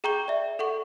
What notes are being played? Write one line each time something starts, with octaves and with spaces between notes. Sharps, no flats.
G#4 G5 A#5 C#6 G6 G7
D5 E5
A4 F#5 C#6